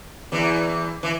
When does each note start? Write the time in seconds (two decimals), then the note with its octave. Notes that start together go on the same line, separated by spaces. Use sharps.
0.32 E2 E3
1.03 E3